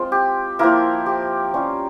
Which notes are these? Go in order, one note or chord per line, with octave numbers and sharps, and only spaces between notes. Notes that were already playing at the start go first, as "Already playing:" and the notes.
Already playing: G#3 C4 F4
G4
F3 A#3 E4 A#4
G4
G3 C#4 F4